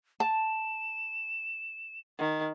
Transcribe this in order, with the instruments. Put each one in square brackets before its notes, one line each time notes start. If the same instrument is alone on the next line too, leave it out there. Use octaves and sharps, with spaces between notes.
[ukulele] A5 [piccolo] E7
[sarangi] D#3